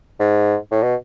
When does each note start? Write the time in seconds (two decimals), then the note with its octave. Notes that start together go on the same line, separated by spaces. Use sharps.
0.20 G#2
0.71 A2
0.83 B2